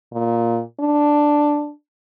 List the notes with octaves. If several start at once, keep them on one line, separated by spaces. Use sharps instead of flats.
A#2
D4